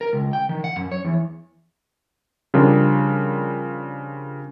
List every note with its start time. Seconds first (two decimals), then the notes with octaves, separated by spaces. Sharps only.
0.01 A#4
0.13 C#2
0.33 G5
0.49 D#3
0.64 F#5
0.76 F#2
0.92 C#5
1.05 E2
2.54 C#3 F3 G3 D4 F4 A#4